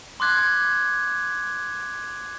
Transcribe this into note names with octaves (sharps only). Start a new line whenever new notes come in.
C6 D6 F#6 G#6